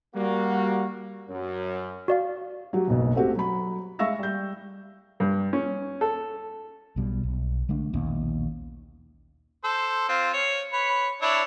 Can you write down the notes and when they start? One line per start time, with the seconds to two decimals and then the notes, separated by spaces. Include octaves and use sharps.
0.15 G3 A#3 F#4
1.28 F#2
2.08 F#4 D5 F5
2.73 F#3 F#4 G4
2.88 F#1 B1 B2
3.15 A3 C4 F#4 G4
3.35 F#3 B5
3.99 G#3 E5 F5 C#6 E6 A#6
4.19 G3 G6
5.20 G2
5.53 C#4
6.01 A4
6.96 B1 B2 G3
7.23 B1
7.69 D3 G#3 A3 D4
7.93 A#1 D#2 B2 C#4
9.64 A4 C5
10.09 C4 F4
10.33 C#5
10.73 B4 C#5
11.22 D4 E4 C#5